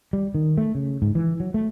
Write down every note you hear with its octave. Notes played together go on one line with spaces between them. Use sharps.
G3
D#3
A3
C#3
G#2
E3
F#3
A3